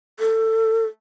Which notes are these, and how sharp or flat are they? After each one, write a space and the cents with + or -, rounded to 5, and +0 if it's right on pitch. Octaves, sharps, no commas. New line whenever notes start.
A4 +20